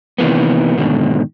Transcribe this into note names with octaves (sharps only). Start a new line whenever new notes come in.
C3 D#3 E3 A#3 B3
G#2 B2 D3 D#3